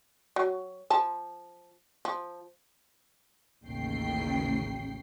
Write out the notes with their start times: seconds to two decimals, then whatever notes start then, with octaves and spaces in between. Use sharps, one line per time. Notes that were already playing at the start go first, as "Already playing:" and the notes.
0.36 F#3
0.90 F3 A5
2.05 F3
3.64 A1 D#2 C#3 G5 C7